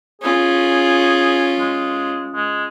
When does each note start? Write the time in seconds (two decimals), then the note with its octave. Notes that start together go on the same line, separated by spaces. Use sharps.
0.22 C#4 F4 G#4
1.59 G#3
2.35 G#3